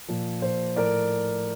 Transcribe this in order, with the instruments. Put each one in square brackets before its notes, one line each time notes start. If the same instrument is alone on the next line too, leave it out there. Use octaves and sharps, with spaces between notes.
[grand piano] A#2 F3
A#2 F3 C5
A2 F3 A#4 D5